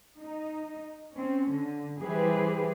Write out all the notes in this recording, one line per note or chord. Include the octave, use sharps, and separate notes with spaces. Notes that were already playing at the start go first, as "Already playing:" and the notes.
D#4
C4 C#4
D3
E3 G3 G4 G#4 B4 C5